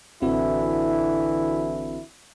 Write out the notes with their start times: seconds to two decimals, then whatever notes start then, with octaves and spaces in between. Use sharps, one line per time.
0.22 A1 D3 E3 C4 E4 F#4